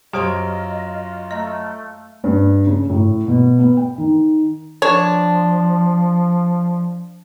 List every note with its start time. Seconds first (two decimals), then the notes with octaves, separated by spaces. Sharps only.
0.13 F#2 F4 G4 C5 D#5 C6 F6 D7
1.31 A3 D#5 A#5
2.24 G2
2.67 C#3
2.90 A2
3.28 B2
3.59 B3
3.77 G5
3.98 D#3
4.82 F3 D4 C#5